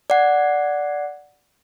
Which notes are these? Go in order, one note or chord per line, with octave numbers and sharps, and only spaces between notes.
D5 F#5